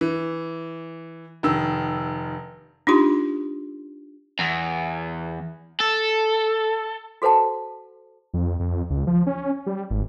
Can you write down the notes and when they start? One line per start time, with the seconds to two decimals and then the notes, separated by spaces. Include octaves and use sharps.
0.01 E3
1.43 F1 D#3 E6
2.87 D4 D#4 F4 G4 C6
4.40 E2
5.80 A4
7.22 F#4 A4 C5 F#5 A5
8.34 F2
8.60 F2
8.90 C#2
9.07 F3
9.27 C#4
9.66 G3
9.90 G#1